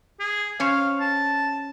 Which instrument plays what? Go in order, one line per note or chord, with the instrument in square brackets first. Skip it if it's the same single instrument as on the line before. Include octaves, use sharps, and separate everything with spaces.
[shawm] G#4
[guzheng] C#4 C5 C#5 [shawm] F5
[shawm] A5